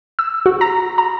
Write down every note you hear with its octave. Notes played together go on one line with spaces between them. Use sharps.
E6
F#4
A#5
A#5